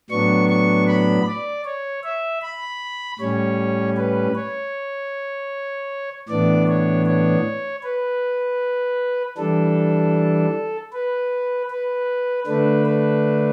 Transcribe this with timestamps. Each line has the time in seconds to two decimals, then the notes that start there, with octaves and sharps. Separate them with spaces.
0.10 A2 F#3 B3 D4 C#6
0.49 C#6
0.88 B5
1.26 D5
1.65 C#5
2.03 E5
2.42 B5
3.20 A2 G3 C#4 C#5
3.97 B4
4.35 C#5
6.28 A2 E3 B3 D4 D5
6.68 C#5
7.06 C#5
7.83 B4
9.37 E3 G3 D4 A4
10.93 B4
11.70 B4
12.47 D3 A3 D4 B4
12.86 B4